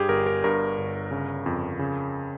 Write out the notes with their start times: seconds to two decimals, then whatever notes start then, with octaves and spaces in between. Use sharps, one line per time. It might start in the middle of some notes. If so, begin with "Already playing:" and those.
Already playing: G2 G4 G#4
0.09 G1 A#4
0.26 A#4
0.44 G2 A#4
0.78 G1
1.11 C#3
1.46 F2
1.79 C#3